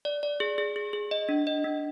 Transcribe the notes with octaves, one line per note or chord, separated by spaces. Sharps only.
D5
D5
G#4
G#4
G#4
G#4
D#5
D4
D#5
D4